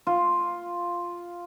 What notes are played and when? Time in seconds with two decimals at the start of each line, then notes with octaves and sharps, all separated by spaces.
0.07 F4